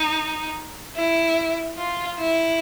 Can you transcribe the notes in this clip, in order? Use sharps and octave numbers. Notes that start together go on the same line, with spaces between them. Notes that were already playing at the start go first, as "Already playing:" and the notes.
Already playing: D#4
E4
F4
E4